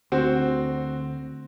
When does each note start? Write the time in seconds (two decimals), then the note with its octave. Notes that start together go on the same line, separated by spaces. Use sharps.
0.12 D2 C4 F#4